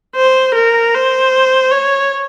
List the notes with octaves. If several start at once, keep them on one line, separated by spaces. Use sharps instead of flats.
C5
A#4
C5
C#5